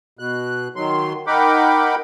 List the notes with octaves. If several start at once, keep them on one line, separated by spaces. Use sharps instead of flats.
B2 F#6
D#3 F#3 C6
D#4 A#4 F#5 G5 B5 D6